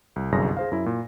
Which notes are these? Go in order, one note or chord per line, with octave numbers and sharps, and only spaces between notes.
C2
G1 C2 F#2 G#4 A#6
G#4 C5 F5
F#2 E4
A#2